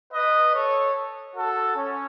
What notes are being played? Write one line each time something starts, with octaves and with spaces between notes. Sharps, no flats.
B4 D#5
A4 C#5
F#4 A4
C#4